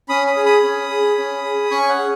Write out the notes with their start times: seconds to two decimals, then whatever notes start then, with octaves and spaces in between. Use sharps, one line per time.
0.09 C#4 B5 D#6
0.27 B5 D#6
0.36 G#4
0.45 B5 D#6
0.63 C#4
0.90 G#4
1.18 C#4
1.44 G#4
1.71 C#4 G#5 C#6
1.89 C#5 F#5
1.98 G#4